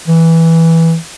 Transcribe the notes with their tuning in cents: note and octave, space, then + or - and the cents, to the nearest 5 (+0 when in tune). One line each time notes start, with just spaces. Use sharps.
E3 -5